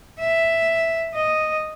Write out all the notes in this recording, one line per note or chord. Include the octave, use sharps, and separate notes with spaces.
E5
D#5